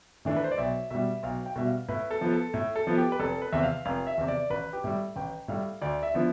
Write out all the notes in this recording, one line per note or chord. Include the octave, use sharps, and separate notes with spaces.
A2 E3 A3 D4 A4
B4
C5
D5
B1 E5
B2 G3 E5
B1 F5
G5
B2 G3 E5
F5
A2 B4
A4
F3 B3
A4
A2
A4
F3 B3
G4
B4
F1 A4
B4
E2 C3 E5
F5
F1 F5
E5
E2 C3
D5
A1 B4
G4
A2 G3
A1 G5
A2 G3 F5
D2 D5
E5
D3 F3 B3 E4